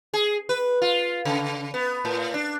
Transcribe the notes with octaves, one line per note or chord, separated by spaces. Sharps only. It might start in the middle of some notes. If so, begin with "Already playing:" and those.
G#4
B4
F4
C#3
B3
A2
D4